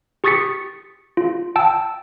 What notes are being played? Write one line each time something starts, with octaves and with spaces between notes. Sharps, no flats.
G4 C#6 D#6 A6 B6 C#7
F4
G5 A5 E6